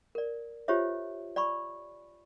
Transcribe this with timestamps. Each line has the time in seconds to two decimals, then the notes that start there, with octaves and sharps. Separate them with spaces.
0.15 A#4 D5
0.68 F4 G4 C5 C#5 E5
1.36 D5 G#5 B5 C#6